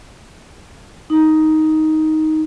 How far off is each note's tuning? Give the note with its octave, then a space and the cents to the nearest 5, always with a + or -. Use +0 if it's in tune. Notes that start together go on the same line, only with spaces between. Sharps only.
D#4 +10